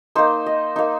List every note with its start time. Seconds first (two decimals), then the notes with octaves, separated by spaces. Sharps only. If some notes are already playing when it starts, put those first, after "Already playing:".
0.15 A#3 D#4 C5
0.46 D#5
0.76 A#3 D#4